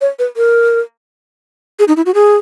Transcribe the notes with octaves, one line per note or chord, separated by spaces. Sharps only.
C#5
B4
A#4
G#4
D#4
E4
F#4
G#4